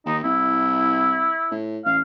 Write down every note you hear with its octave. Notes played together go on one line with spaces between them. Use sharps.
D#2 D#4
C2 E4
A2
A1 F5